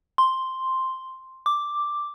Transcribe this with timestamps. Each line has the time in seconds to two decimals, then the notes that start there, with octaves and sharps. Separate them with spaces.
0.18 C6
1.46 D6